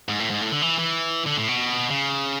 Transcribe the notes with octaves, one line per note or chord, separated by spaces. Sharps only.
G#2
A2
G#2
A2
D3
E3
E3
D3
A2
B2
C#3